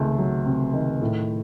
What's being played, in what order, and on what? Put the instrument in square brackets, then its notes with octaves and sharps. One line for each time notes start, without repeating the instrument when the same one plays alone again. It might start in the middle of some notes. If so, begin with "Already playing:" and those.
Already playing: [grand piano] C#2 C3 D#3 [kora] A3
[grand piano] F#3
C3
D#3
A2